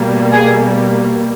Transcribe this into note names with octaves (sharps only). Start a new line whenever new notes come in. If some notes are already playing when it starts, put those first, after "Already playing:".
Already playing: B2 G3 A#3
G#4